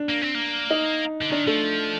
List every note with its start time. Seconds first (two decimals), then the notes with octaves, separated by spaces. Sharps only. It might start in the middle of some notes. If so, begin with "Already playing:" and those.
Already playing: D4
0.09 A#3
0.22 C4
0.35 A#3
0.70 D#4
1.22 D3
1.32 D#3 D4
1.47 F3 A3